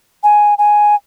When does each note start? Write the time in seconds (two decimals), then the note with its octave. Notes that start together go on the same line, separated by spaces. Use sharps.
0.23 G#5
0.58 G#5